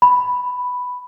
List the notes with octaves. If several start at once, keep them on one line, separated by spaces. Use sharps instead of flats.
B5